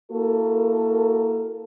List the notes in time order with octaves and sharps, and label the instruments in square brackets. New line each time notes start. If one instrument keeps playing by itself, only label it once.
[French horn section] A#3 E4 F#4 A4 A#4